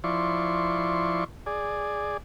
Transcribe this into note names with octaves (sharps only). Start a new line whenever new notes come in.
F3 E4 D5 C6 C#6
G#4 D5